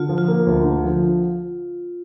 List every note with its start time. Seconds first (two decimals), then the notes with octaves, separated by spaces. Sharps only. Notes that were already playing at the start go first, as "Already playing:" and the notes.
Already playing: D3 F4
0.09 F3
0.18 F4
0.28 A#3
0.47 D2
0.64 D3
0.84 F3